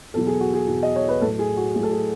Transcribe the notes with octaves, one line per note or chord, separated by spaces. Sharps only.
E2 B2 F#3 A4
G#4
F#4
G#4
E2 B2 F#3
D#5
C#5
B4
A2 F#3 A4
G#4
F#4
A2 F#3 G#4 A4
G#4